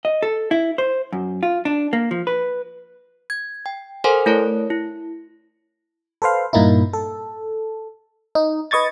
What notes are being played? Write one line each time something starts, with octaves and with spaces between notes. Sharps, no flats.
D#5
A4
E4
C5
F#2
F4
D4
A#3
F3
B4
G#6
G5
A4 A#4 C5 F#5 G#5 C6
A3 E4 A#4 C#5 A5
E4
A4 B4 C5 F5
G2 A#2 A#3 D#4 E4
A4
D#4
B4 D#5 C#6 G#6 A6